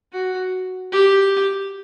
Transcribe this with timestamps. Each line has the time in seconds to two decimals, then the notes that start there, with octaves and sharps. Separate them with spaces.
0.12 F#4
0.92 G4